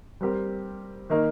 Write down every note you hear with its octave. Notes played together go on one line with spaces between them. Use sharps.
G3 C4 G4 A#4
D#3 A#3 D#4 A#4